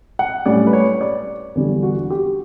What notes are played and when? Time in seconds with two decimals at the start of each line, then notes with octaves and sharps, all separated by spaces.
0.19 F#5
0.46 A2 G3 C#4 D5
0.67 B4
0.73 C#5
1.01 D5
1.55 E2 D3 G3
1.83 F#4
2.10 G4